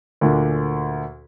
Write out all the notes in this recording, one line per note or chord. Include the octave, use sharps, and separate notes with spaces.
D2 A#2 D3